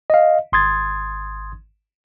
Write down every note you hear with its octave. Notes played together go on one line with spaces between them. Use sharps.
D#5 F5
G#1 C6 D#6 G#6 A6